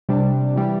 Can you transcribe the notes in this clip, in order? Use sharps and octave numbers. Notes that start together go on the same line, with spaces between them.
C3 G3 D4
E3 G3